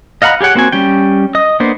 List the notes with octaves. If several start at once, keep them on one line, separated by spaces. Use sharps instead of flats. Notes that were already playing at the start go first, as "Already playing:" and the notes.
D#5 F5 F#5 A#5 B5
G4 G#4 C#5 F#5 G5
A#3 C4 F#4 G#5
G3 C#4 G5
D#5 D#6
A#3 B3 D4 C5